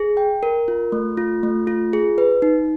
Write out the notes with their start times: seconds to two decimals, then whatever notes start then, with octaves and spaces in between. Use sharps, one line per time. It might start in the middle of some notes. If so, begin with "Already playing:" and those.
Already playing: G#4
0.17 G5
0.43 A#4
0.68 F4
0.92 A3
1.17 F4
1.43 A3
1.67 F4
1.93 G#4
2.18 B4
2.42 D#4